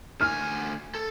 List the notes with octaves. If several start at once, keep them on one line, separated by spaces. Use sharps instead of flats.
D2 G#5 F6
A4